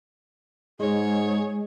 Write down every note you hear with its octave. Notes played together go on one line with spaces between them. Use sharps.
G#2 G#3 G#4 C#5